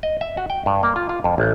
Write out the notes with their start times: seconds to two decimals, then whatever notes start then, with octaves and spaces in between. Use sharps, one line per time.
0.03 D#5
0.21 E5
0.37 F#4
0.50 G5
0.66 G2
0.83 A#3
0.96 F4
1.09 F4
1.24 F2
1.38 A1